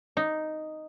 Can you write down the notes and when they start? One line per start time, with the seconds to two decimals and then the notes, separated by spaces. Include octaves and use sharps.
0.17 D#4